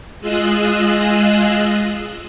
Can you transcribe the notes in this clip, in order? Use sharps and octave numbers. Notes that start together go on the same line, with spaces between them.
G#3 F4 G#4 D#5 E6 F#6